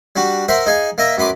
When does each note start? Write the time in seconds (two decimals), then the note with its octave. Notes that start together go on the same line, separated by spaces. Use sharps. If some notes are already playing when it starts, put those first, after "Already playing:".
0.16 G3 D4 F#4
0.48 A#4 C5 E5 F#5
0.66 D#4 G#4 F5
0.98 A#3 D#5 E5 A#5
1.18 F#2 B4 C6 D6